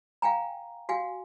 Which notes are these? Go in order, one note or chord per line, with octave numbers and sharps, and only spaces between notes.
F5 G5 G#5 A#5
F#4 F5 G#5